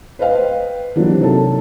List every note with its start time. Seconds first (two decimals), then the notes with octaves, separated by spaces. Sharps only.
0.19 B4 C5 D#5 F5 G5
0.96 E3 F#3 G3 A#3 C4 D4
1.20 C3 F#3 D#4 A4 A5